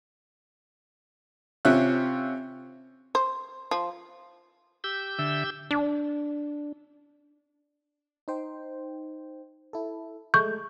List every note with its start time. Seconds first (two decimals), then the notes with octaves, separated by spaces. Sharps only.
1.65 C3 C#4 F4 E5 F#6
3.15 C5
3.71 F3
4.84 G4 E6 G6
5.19 D3 E5
5.71 D4
8.28 D#4 C5 G5
9.73 E4 A4
10.34 G#3 A3 C#6 G6